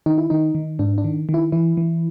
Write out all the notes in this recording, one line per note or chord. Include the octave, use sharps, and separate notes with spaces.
D#3 D#4
E4
D#3 D#4
D#3
G#2 D4
D4
D#3
D#3
E4
E3 E4
E3